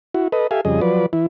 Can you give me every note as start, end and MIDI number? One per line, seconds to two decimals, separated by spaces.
0.15 0.28 64
0.15 0.28 66
0.32 0.47 69
0.32 0.47 71
0.32 0.47 75
0.51 0.61 67
0.51 0.61 69
0.51 0.61 76
0.51 0.61 77
0.51 0.61 80
0.65 0.81 41
0.65 0.81 49
0.65 0.81 55
0.65 0.81 68
0.65 0.81 75
0.81 1.06 53
0.81 1.06 54
0.81 1.06 71
0.81 1.06 74
1.13 1.26 52
1.13 1.26 64